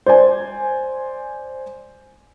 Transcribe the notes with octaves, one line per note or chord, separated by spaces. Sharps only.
C5 D5 G#5